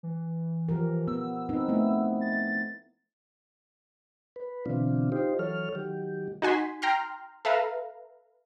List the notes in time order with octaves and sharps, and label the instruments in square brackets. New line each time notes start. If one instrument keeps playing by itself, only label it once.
[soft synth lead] E3
[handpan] F3 G4 A#4
[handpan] B3 [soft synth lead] E6
[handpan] C4 D#4 B4
A3 B3 E4
[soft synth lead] A6
[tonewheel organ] B4
B2 D3 E3 C4 D4 F4
D#4 F4 G4 C5
E3 F#3 A4 C#5 F6
D#3 F#3 G4
[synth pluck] D#4 F#4 G#5 C6 B6
G5 A#5 C6 F6
A4 B4 E5 F5 A#5